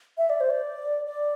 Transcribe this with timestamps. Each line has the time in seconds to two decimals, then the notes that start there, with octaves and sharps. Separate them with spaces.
0.18 E5
0.30 D5
0.40 C5
0.50 D5
1.06 D5